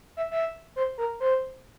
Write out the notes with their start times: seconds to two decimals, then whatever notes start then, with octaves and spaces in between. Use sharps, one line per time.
0.17 E5
0.31 E5
0.76 C5
0.98 A#4
1.20 C5